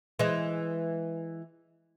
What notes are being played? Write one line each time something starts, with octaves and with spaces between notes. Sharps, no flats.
E3 G#3